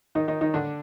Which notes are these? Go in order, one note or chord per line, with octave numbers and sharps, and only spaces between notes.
D#3 D#4
D#3 D#4
D#3 D#4
D3 D4